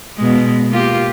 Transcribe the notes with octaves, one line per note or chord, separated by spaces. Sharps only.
B2 G#3
A#3 F4 G4